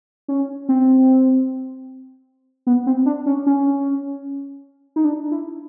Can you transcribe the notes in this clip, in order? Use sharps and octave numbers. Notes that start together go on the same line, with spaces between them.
C#4
C4
B3
C4
D4
C#4
C#4
D#4
D4
E4